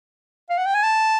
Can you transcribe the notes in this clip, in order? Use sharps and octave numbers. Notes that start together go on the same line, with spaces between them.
F5
F#5
G5
G#5
A5